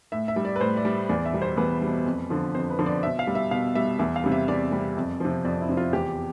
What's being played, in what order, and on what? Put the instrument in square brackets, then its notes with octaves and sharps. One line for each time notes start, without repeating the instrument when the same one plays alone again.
[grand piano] A2 E5
E5
G3
D5
B4
A2 C5
D5
G3
E2 D5
E5
B2 G3
C5
E2 B4
B2 G3
F2
D3 F3
F2 C5
B4
D3 F3
D5
B2 E5
F5
G3
E5
B2 F5
G3 E5
E2 E5
F5
C3 G3
E5
E2 D5
C3 G3
F2
C3 F3
F2 D5
E4
C3 F3
F4
E2 G4